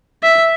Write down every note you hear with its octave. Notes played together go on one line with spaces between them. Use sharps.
E5